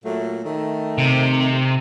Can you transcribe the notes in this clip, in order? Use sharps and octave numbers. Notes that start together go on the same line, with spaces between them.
A#2 F#3 A3
D#3 A3
C3